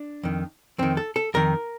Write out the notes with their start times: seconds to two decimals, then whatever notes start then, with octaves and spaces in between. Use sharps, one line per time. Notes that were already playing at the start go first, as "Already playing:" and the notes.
Already playing: D4
0.23 F2 D#3
0.78 F2 D#3 C4
0.97 A4
1.16 A4
1.34 F2 D#3 A#4